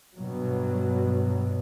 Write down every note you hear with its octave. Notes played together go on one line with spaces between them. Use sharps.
G2 B2 F#3